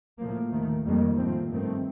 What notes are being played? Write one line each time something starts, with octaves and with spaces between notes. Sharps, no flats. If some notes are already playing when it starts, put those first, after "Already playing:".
A2 F3 A#3
D#2 D#3 A3
F2 D#3 G3 A#3
A2 F3 C4
G2 D#3 A3 C4